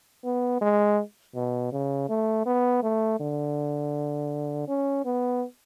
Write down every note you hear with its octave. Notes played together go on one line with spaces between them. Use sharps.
B3
G#3
B2
C#3
A3
B3
A3
D3
C#4
B3